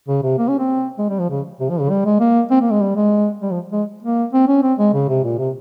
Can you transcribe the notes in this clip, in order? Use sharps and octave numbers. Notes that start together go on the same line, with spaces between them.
C#3
C3
A#3
C#4
C4
G#3
G3
F3
C#3
C3
F3
C#3
G3
G#3
A#3
C4
A#3
G#3
G3
G#3
G3
F3
G#3
A#3
C4
C#4
C4
G#3
C#3
C3
A#2
C3